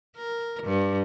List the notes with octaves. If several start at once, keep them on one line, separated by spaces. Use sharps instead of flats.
A#4
G2